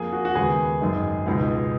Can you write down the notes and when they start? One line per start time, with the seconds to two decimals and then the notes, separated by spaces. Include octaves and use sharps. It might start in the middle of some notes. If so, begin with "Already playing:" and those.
Already playing: F2 F3 A#3 G#4
0.13 F#4
0.25 F#4
0.35 D#2 C#3 G#3 B3 G#4
0.81 G#1 F#2 D#3 G#3 D#4
1.26 C#2 B2 G#3 D#4